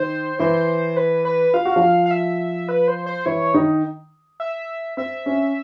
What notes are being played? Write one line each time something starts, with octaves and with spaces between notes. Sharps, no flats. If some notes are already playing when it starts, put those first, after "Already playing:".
Already playing: D#3 D#4 C5
E3 E4 C5
B4
B4
F4 F5
F#4
F3 F4
F5
E5
B4
C5
C5
E3 E4 C#5
D#3 D#4
E5
C4 E5
C#4